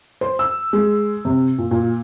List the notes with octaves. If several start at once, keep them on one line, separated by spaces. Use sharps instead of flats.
C5
E6
G#3
C3
A#2
A#2